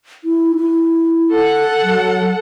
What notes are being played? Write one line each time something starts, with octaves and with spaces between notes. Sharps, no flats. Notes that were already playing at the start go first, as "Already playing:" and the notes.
E4
E4
A4 F#5
F#3